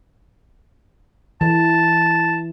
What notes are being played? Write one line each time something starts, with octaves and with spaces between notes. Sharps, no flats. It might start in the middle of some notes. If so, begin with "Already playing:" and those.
E3 A5